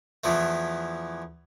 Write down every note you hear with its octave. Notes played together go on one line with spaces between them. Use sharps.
E2 E3 F3 A3